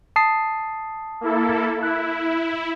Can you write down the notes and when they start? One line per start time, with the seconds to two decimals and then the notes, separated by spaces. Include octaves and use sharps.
0.16 A5 D#6 C7
1.21 A#3 E4 A4
1.83 E4 F#6